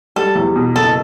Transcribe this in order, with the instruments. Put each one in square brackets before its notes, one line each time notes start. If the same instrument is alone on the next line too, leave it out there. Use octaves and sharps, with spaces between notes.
[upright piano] G3 [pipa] A4
[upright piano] E2
B2
[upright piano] F#1 [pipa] A4